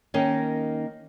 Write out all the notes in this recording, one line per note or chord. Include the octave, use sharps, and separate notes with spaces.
D#3 A#3 C#4 D#4